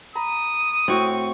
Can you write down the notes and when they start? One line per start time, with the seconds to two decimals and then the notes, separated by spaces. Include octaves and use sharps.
0.15 A#5 B5 D#6
0.88 A2 C4 E4 F#4 C#6